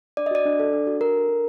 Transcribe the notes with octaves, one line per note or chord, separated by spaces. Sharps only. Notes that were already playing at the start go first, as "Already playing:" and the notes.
D4 D5
D#5
F#4 D5
D4
A4
D4
F#4
D4 A#4
A4
D4